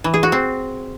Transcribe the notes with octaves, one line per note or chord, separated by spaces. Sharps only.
E3
G#4
F#4
C4